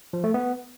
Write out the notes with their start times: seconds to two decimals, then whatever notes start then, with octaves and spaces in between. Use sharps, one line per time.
0.13 F3
0.24 A3
0.34 B3